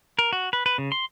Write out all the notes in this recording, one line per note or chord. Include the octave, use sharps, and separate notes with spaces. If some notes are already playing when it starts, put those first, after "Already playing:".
A#4
F#4
B4
B4
C#3
C6